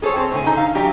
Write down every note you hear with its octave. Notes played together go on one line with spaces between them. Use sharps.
G#4 A4 C5 C#5
C4 C5
A2 D3 G#5
D3 D#4 A4
F5
E3 F#3 D4 G4 A#5